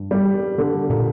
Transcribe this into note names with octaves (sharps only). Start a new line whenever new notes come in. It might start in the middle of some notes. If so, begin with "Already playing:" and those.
Already playing: G2
G3
D3
A#2